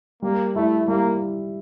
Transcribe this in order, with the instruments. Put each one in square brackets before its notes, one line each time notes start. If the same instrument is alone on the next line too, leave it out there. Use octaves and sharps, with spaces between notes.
[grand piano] G3 [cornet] A#3
[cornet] A3 [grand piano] E4
[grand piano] G3 [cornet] A#3